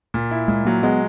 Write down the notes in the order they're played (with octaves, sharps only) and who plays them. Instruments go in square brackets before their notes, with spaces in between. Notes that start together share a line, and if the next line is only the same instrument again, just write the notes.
[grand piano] A#2
E4
[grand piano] A#2 [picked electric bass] G#3
[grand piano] F#3 [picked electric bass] A#3
[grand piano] G#3 [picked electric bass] B3